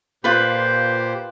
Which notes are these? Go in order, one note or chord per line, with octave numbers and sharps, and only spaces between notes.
A#2 F4 G4 B4 C5